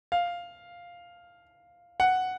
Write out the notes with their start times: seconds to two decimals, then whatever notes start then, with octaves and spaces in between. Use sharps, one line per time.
0.12 F5
2.00 F#5